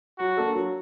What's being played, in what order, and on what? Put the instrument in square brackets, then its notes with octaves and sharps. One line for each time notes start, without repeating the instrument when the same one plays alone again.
[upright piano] F#3 [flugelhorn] F#4
[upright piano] A#3 D4 A4
F#3